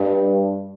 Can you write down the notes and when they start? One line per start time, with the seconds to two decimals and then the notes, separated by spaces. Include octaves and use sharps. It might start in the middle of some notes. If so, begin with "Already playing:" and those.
Already playing: G2 G3